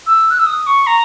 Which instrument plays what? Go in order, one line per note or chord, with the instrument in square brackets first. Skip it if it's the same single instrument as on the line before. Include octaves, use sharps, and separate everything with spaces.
[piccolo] E6
F#6
E6
D#6
C#6
A#5